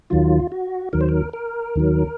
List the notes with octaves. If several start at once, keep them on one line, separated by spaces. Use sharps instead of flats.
D#2 D#3 F#3 F4
F#4
D#2 D#3 F#3 A#4
C5
A#4
A#4
D#2 D#3 F#3